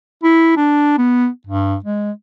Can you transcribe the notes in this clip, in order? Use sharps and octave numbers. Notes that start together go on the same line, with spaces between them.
E4
D4
B3
G2
G#3